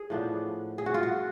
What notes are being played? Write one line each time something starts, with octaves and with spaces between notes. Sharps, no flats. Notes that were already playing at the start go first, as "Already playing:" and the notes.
Already playing: G#4
A2 F3 B3 D4
G#4
F#4
F4
F#4